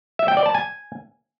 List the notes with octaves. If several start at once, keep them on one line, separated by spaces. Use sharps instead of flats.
E5
G5
D5
A5
G#5